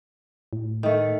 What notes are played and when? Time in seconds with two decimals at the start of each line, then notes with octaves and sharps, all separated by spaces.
0.53 A2
0.83 D#3 A3